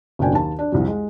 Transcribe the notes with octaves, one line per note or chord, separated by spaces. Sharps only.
F#1 B2 D4 G5 G#5
D#2 A5
D4
C2 F2
G#3